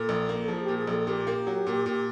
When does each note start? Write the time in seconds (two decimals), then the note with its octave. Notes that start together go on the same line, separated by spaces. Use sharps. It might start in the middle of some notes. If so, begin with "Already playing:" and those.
Already playing: A#2 A4
0.09 A#1
0.29 A#3
0.43 A4
0.48 F3 G#4
0.63 G4
0.68 A#2
0.78 G#4
0.87 A#1
0.93 A4
1.07 A#2 G4
1.27 A#3
1.47 F#3
1.67 A#2
1.86 A#2